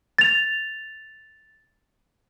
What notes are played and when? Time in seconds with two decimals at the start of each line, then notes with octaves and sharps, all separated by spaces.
0.18 A6 F7